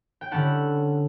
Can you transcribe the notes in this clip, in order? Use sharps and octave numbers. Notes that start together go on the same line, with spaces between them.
G5
D3 G3 C#4 E4 F#5 A5